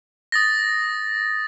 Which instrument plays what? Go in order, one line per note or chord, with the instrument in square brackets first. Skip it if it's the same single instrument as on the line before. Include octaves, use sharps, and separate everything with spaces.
[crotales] D#6 A6 A#6